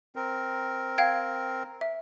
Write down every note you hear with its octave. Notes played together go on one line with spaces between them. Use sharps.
C4 A#4
F5 G5 G#6
E5